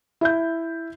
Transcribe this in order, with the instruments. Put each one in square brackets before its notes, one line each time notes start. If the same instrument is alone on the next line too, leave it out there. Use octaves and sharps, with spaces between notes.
[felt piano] E4 E5 G6